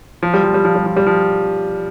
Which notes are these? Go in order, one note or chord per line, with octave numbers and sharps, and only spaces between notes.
F3
G3
F3
G3
F3
G3
F3
G3
F3